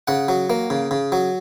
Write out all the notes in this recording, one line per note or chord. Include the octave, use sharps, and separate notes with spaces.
C#3 F#5
F#3
A#3
C#3
C#3
F#3